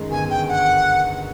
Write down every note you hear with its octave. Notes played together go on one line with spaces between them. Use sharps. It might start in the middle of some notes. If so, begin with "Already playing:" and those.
Already playing: F#2 D#3 G#3
G1 G#5
G5
F#5